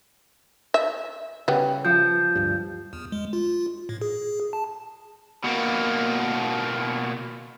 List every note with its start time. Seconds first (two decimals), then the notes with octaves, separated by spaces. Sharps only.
0.74 E5
1.48 C#3 G3 B3 G4
1.85 F3 G6
2.35 D1 G2
2.93 E2
3.12 G#3
3.33 F4
3.89 A2
4.01 G#4
4.53 A5
5.44 B2 A#3